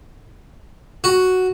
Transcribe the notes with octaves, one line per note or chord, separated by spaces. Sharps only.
F#4